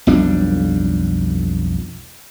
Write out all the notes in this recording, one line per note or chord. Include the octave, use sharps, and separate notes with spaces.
B1 F2 G3 D4